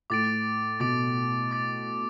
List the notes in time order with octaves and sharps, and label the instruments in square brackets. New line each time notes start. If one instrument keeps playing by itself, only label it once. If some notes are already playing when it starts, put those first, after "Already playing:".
[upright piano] A2 [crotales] D6 A6 D7
[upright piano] B2 [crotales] D6 A6 D7
[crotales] D6 A6 D7